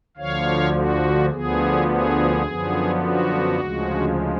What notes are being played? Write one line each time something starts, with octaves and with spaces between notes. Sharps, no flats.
D2 D3 F3 C#5 F5
F#4
D2 D3 F3 B3 G#4
G#4
F#2 D3 F3 B3
F#4
D2 C#3 F3 G#3